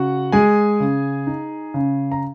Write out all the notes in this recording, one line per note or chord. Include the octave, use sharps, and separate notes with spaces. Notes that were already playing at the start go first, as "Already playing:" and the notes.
Already playing: C#3 F#4 F#5
G#3 G#4 G#5
C#3
D#4
C#3
A#5